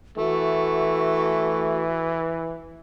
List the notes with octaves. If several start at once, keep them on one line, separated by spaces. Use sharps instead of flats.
E3 A3 F#4